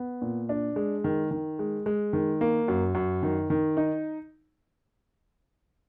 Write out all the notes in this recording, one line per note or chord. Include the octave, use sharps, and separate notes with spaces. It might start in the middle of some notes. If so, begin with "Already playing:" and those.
Already playing: B3
A#2
D4
G#3
D#3
D#3
G#3
G#3
D#3
A#3
F#2
F#2
D#3
D#3
D#4